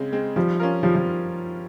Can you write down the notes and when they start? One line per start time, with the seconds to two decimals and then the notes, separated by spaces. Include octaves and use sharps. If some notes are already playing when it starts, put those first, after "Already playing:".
Already playing: C#3 G#3 C4
0.12 G#3 C4
0.36 F3 G3
0.60 C#4 F4 A#4
0.83 F3 G3
0.95 F3